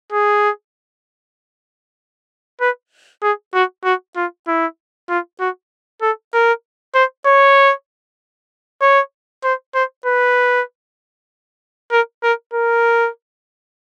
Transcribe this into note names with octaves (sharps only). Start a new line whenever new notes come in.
G#4
B4
G#4
F#4
F#4
F4
E4
F4
F#4
A4
A#4
C5
C#5
C#5
C5
C5
B4
A#4
A#4
A#4